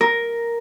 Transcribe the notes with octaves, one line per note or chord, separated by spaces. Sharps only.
A#4